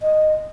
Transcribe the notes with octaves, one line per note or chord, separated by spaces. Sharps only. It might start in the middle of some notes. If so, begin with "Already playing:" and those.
D#5